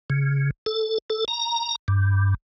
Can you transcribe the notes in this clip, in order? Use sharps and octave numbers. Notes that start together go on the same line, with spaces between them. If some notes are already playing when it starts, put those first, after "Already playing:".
C#3
A4
A4
A#5
G2